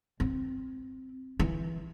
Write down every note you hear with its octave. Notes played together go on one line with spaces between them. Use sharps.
C4
E3